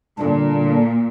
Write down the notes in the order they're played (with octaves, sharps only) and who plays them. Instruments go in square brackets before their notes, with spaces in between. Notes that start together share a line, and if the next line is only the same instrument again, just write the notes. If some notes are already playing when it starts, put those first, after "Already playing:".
[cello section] A#2 [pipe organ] D3 G3 D4